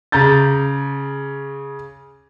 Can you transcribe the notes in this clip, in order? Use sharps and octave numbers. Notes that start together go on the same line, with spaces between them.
C#3 A#5 G6 A6